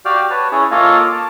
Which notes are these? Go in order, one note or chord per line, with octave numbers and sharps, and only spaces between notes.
F#4 G4 D5 F5 G5 F6
B4 C#5 A5
C#4 E4 G#4 C#5
A#3 F4 A4 C#5 D#5 F5
D6
A5